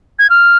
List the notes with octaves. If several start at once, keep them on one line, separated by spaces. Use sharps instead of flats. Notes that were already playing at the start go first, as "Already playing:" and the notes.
G#6
F6